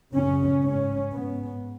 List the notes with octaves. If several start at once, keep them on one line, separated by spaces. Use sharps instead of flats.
F#2 C#3 C#4
G#2 C#4
G#2 B3